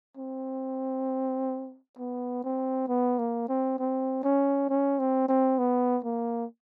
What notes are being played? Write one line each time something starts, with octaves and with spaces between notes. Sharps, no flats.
C4
B3
C4
B3
A#3
C4
C4
C#4
C#4
C4
C4
B3
A#3